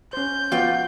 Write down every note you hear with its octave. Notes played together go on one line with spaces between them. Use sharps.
C#4 C5 G6
F3 B3 F4 F#4 D5 G5